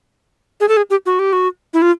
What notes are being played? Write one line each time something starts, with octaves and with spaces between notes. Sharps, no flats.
G#4
A4
G#4
G4
F#4
G4
F#4
E4
F4